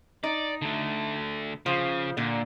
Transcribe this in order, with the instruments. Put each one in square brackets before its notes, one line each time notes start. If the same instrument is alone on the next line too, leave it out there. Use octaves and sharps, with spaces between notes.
[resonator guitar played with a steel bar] D#4 [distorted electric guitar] D5
[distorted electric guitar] D3 A3
[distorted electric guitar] C#3 [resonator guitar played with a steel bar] F3
[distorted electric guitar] A#2 [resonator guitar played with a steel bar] D3